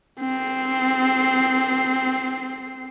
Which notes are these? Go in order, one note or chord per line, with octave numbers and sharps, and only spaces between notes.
C4 C7